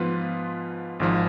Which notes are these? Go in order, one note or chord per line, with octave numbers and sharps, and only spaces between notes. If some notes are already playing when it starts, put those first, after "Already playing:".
Already playing: G#2 F3 B3 F4 B4
G#1 G#2 F3